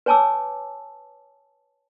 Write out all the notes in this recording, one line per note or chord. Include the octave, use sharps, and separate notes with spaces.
B4 C#5 G#5 A5 D6 E6